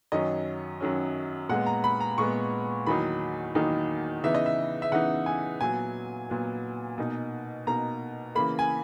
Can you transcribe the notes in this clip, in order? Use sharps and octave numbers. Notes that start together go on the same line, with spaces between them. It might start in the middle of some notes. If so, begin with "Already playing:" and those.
F#2 D#3 F#3 C#4 D#5
F#2 D#3 F#3 C#4
A#2 G#3 B3 F#5
A#5
B5
A#5
A#2 G#3 B3 C#6
E2 D#3 F#3 A#3 D#4 B5
E2 D#3 F#3 A#3 D#4
C#3 E3 B3 D#4 E5
D#5
E5
E5
C#3 E3 B3 D#4 F#5
G#5
A#2 F#3 B3 G#5
A#2 F#3 B3
B2 A#3 D#4
B2 A#3 D#4 A#5
C#3 E3 A#3 B5
G#5